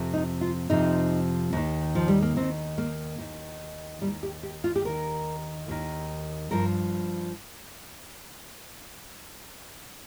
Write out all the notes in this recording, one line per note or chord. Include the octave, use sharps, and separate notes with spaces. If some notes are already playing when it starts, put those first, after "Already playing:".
Already playing: F2 C3 F3
D#4
F4
F2 C3 F3 D#4
D#2 D#3
F3
G3
A#3
D#2 D#3 C4
A#3
D#2 D#3
D#2 D#3 G3
G4
G4
F4
G4
D#2 D#3 A#4
D#2 D#3
G2 F3 A#4